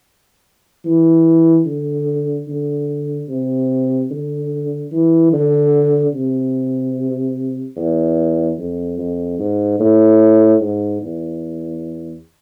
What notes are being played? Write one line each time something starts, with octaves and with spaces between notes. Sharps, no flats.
E3
D3
D3
C3
D3
E3
D3
C3
E2
F2
F2
G#2
A2
G#2
E2